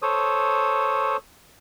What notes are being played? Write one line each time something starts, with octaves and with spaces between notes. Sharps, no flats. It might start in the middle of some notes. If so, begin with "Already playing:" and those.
A4 C5 C#5 D#6